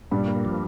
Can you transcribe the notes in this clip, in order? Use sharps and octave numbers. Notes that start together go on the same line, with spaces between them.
G2 A#2 G3
A#3
F3